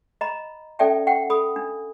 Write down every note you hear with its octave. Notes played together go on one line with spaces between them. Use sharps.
D#5 A#5 B5
C#4 A4 D5 E5 G5 A5
F#5 G5
A4 B5 D#6
D4